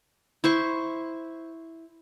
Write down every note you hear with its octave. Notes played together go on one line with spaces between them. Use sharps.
E4 C5 C#6